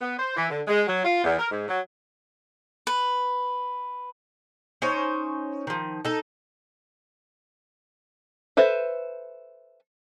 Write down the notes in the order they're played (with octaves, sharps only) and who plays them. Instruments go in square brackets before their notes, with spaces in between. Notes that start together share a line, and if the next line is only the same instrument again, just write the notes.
[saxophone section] B3
C5
E3
D3
G#3
F#3
F4
E2
A#4
G#2
F#3
[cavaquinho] B4
[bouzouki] C#4 D#4 C5 C#5
D#3 F3
D#4 A4
[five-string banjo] A4 B4 C5 E5